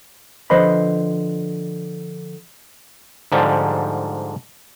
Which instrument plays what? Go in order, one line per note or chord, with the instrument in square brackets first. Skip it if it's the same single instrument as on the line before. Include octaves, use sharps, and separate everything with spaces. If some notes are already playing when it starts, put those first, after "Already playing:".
[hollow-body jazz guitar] D3 F3 B4 C5 D#5 B5
[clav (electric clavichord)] G#2 D3 F3 G3